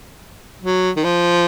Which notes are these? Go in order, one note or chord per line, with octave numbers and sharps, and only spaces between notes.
F#3
D#3
F3